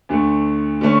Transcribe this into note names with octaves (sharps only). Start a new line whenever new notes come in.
D2 D3 A3
D3 A3 C#4